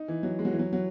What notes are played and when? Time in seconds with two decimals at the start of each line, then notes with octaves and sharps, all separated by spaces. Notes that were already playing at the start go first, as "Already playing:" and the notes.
Already playing: D#4
0.08 E3
0.23 F#3
0.39 G#3
0.45 F#3
0.53 E3
0.59 F#3
0.73 F#3